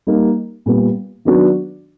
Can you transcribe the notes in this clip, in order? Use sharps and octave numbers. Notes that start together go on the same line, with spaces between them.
G3 A#3 D#4
A#2 G3 B3
D#3 F#3 B3 D4 F#4